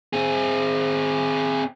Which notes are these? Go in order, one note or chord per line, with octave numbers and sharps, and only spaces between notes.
C4 G#4